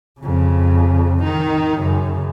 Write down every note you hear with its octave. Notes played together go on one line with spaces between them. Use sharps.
F2 C#3
D#3 D#4
F#2 C#3